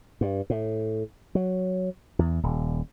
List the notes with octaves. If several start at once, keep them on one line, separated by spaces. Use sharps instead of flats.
G2
A2
F#3
E2
D#1